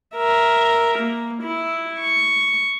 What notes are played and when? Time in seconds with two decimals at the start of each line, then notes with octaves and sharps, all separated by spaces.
0.16 A#4 E5
0.98 A#3
1.42 E4
2.00 C#6